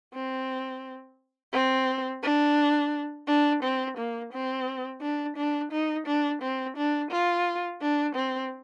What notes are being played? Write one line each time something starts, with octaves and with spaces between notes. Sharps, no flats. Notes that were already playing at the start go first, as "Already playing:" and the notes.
C4
C4
D4
D4
C4
A#3
C4
D4
D4
D#4
D4
C4
D4
F4
D4
C4